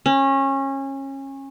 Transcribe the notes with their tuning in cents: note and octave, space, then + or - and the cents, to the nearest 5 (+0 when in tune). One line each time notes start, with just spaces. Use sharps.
C#4 -25